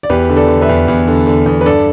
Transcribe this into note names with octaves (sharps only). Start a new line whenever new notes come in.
D5
E2 G4 B4
D3
A4 D5
D3
B4 E5
E2
E2
D3
D3
E2
B4
G2 A4 D5